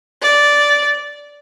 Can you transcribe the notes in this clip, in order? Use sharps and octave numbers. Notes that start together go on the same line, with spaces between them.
D5